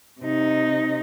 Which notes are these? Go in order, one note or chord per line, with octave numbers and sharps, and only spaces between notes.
C3 D#4